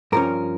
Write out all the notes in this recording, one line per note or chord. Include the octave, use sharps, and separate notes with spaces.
G2 F3 C#4 A#4